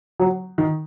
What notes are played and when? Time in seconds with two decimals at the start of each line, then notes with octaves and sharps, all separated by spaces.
0.20 F#3
0.58 D#3